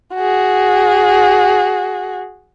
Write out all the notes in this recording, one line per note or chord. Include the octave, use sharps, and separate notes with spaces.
F#4 G#4